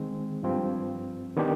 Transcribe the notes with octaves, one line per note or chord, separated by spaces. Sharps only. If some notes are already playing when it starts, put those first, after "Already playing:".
Already playing: D#3 G#3 C4
G2 F3 C4
D#3 B3 D4 G4